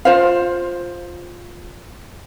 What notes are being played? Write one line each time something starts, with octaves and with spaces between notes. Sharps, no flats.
F4 C5 F5